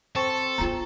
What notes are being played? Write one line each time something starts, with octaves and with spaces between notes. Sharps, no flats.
C4 A4 A5 C#6
B3 F4 A#5